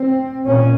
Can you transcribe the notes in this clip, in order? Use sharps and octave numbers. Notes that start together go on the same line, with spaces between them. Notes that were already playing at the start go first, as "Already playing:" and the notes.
Already playing: C4
A#2 C#4